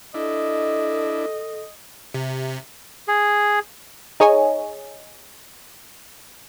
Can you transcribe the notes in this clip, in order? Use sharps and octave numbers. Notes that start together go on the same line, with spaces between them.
D4 E4 A4 D#5
C3
G#4
D#4 G#4 C#5 D#5 G#5